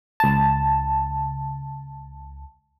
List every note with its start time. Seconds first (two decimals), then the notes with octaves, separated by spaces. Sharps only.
0.20 C#2 A5